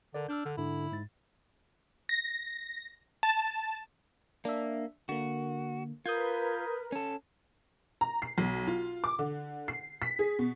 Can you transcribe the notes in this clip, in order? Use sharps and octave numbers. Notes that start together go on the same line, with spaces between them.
D3 A4 A#4 D5
D4 E6 F6 G6
D3
G#2 D3 E4
G#2 A6
A#6
A5
A#3 D4 E5
D3 A#3 F#4
F4 A#4 B4 D#6 G6 G#6
C#4 A4
A#5
C7
B1
F4
D6
D3
C7
B6
G#4
B2